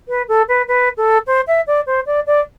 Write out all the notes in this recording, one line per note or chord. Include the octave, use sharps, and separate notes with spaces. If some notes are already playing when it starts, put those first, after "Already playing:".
B4
A4
B4
B4
A4
C5
E5
D5
C5
D5
D5